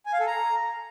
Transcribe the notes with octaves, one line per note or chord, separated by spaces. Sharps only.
G#5
F5
A4
A#5